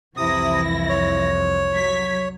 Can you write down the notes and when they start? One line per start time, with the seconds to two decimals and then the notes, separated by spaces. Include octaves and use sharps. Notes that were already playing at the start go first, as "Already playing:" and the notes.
0.17 C2 F2 C3 E3 E4 D#6 A#6
0.89 C#5
1.71 F#3 G#6 B6